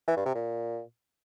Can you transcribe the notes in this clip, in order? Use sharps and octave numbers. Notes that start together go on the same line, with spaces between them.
E3
G2
C3
A#2